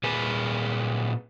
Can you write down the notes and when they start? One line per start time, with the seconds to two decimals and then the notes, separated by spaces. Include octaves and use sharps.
0.04 A#2 G#4 B4 G#5